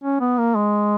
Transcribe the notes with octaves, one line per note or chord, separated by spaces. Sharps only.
C#4
B3
A#3
G#3